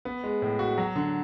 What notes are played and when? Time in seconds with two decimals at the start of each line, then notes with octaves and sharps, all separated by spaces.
0.05 B3
0.24 G#3
0.42 A2
0.59 F#4
0.78 F#3
0.96 D3